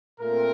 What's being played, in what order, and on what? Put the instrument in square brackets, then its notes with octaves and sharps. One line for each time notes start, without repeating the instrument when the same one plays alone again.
[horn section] A#2 A3 C4 A#4